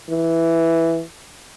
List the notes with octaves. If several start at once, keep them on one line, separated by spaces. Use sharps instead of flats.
E3